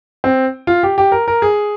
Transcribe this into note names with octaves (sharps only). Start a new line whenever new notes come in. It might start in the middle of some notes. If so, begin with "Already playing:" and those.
C4
F4
G4
G4
A#4
A#4
G#4